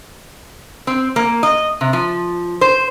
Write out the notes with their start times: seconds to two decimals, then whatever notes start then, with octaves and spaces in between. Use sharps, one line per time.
0.87 C4
1.16 A#3
1.43 D#5
1.81 C3
1.93 F3
2.61 C5